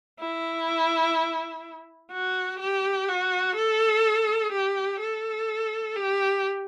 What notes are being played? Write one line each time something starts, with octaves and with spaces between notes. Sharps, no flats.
E4
F#4
G4
F#4
A4
G4
A4
G4